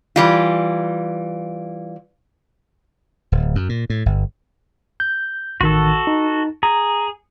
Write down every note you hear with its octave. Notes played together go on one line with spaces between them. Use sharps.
E3 G3 F4
D1
F#2
A#2
A2
G1
G6
A1 D#3 F#4 A4
D#4
G#4 A#5